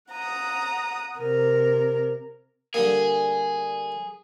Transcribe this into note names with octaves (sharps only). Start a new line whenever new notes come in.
F#5 A#5 D#6
C3 A#4
D3 G3 A#3 G#4